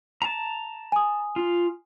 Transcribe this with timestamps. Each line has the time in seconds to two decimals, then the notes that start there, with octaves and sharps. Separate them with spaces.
0.22 A5 A#5
0.92 G#5 D#6
1.36 F4